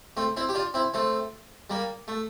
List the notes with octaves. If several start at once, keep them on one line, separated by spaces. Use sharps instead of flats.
A3 C4
C4 E4
G4
D4 F4
C4 E4
A3 C4
G3 A#3
A3